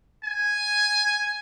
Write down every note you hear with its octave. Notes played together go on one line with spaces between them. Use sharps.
G#5